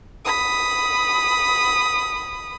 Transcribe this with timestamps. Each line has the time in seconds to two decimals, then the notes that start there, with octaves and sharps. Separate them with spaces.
0.25 B5 D#6